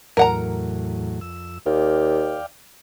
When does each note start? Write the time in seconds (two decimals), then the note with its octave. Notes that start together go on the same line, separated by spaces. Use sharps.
0.17 E2 A2 F#3 A#4 F#5 A#5
1.21 F2 E6
1.66 D#2 D5 F5 G5